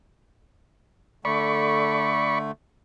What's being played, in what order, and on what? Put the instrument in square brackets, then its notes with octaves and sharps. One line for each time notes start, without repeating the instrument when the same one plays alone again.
[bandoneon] D3 A3 [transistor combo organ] D5 B5 C#6